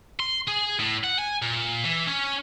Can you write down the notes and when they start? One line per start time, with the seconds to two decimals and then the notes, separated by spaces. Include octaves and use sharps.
0.20 C6
0.48 G#4
0.79 A2
1.03 F#5
1.19 G#5
1.42 A#2
1.84 E3
2.07 C#4